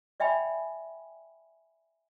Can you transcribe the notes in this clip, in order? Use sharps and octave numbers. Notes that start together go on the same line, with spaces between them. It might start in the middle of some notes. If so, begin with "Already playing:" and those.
D5 E5 G5 G#5 B5